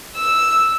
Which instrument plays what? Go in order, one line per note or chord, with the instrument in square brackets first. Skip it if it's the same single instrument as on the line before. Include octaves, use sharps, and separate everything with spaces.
[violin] E6